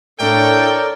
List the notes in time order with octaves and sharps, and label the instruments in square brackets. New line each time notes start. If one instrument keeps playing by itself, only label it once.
[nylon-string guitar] A2 D4 [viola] A4 C#5 [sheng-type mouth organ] A#4 D5 [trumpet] G5